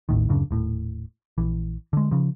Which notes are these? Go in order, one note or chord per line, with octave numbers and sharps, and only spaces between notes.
A1 D#2 A2 D#3
D1 F#2 C#3 D4
D#1 A2
A#1 E3
D3 G#3
C#3 F3